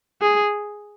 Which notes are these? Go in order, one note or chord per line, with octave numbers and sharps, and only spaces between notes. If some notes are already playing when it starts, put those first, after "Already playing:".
G#4